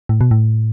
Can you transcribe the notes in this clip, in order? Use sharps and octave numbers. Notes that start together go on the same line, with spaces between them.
A2
B2
A2